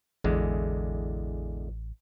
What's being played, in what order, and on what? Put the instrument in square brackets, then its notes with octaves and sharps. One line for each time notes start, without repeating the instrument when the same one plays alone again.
[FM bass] A1 [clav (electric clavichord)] E2 D3 G#3